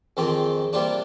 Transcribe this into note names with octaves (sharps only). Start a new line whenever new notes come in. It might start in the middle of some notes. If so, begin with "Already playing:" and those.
F2 D#3 G#3 C4 G4
C3 G3 A#3 D4 F4